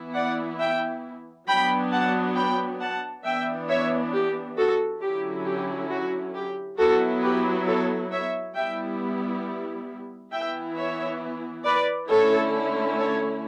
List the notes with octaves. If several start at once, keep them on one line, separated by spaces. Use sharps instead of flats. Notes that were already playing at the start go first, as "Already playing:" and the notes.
Already playing: E3 B3 E4
D5 F#5
E5 G5
F#3 B3 D4 G5 B5
F#5 A5
G5 B5
F#5 A5
E3 B3 D4 E5 G5
C#5 E5
G4
F#4 A4
D3 F#3 C#4 E4 G4
G4
F#4
G4
F#3 B3 E4 F#4 A4
G4 B4
A4 C#5
C#5 E5
G3 B3 E4 E5 G5
E3 B3 E4 E5 G5
C#5 E5
B4 D5
D3 A3 C#4 E4 A4 C#5
A4 C#5